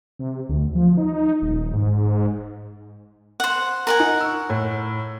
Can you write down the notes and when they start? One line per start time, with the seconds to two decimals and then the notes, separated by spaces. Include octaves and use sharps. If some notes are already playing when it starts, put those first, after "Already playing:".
0.19 C3
0.49 D2
0.75 F3
0.97 D#4
1.42 D#1
1.73 G#2
3.40 C5 F#5
3.87 A#4 F#5 G#5
4.00 D#4
4.21 C#6 E6
4.50 A2